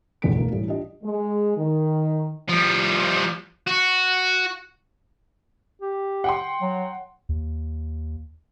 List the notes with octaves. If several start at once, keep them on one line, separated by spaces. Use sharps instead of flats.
F#1 B1 E2 A3 B6 D7
C#2 A3 A#3 D#4 A#4
A2 E3 G3
D4 F4 G4 D#5
G#3
D#3
F3 G3
F#4
G4
F#5 G5 C6
F#3
D#2